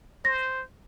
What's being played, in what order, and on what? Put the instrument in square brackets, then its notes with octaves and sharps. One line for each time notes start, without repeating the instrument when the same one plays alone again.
[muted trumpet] C5 [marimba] A#6